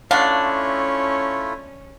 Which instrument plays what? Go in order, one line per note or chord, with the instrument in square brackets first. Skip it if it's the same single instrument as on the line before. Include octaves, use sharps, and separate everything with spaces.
[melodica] A3 E4 F4 [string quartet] C#4 [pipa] D4 [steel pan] F5 F#5